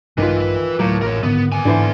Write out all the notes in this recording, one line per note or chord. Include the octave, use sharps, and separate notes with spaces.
A#1 G2 D#3 E3 G#3 F4 B4
D2 A2 F#3 A#3
A1 A#4 C#5
G#2 D3 D#3 B3
B3 G#5
G#2 D3 E3 C5